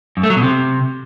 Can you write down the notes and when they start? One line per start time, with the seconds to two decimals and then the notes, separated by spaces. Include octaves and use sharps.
0.17 F#2
0.23 A3
0.30 F#3
0.36 B2
0.43 C3